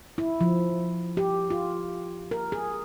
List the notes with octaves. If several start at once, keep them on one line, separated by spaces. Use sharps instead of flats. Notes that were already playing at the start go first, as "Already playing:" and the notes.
E4
F3
G4
F4
A#4
G#4